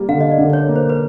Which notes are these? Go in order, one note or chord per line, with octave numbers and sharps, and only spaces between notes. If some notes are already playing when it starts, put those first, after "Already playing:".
Already playing: G3 A#3
D3 F5
D#5
D5
D3
C#5
A#3
C5
B4